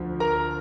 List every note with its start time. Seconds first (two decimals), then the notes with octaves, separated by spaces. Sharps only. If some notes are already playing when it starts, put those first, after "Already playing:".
Already playing: D2 D3 F3
0.20 A#4 A#5